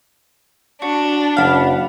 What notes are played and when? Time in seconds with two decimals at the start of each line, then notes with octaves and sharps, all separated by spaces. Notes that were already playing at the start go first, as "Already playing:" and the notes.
0.82 D4 F#4
1.37 F#1 F5 F#5 B5